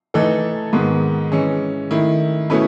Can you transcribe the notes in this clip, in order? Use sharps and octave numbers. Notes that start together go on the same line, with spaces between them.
E3 A3 D#4 A4
G#2 D#3 G#3 B3
E3 G#3 C#4
D#3 A3 E4
B2 A3 C#4 E4 B4